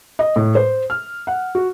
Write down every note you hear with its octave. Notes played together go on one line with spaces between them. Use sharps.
D#5
A2
C5
F6
F#5
F#4